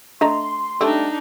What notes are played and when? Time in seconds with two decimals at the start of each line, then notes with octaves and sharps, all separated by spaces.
0.21 A3 D4 D#5 A#5 C6
0.81 G3 A3 C4 D4 D#4 A4